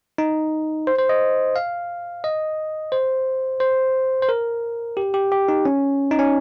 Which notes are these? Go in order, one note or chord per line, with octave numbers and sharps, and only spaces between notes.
D#4
C5
C5
D#5
F5
D#5
C5
C5
C5
A#4
G4
G4
G4
D#4
C#4
D#4
C#4